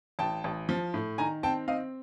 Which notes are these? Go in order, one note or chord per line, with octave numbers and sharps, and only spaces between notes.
A1 G5 A5
A1
F3
A2
D#3 G#5 A#5
C4 G5 A5
C4 D#5 F5